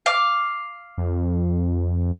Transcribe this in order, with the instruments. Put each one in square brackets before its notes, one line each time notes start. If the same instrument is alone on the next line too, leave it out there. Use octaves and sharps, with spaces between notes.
[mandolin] F5 D6
[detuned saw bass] F2